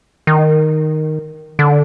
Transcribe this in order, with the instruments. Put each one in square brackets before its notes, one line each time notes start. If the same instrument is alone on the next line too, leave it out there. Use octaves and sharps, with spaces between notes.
[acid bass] D#3
D3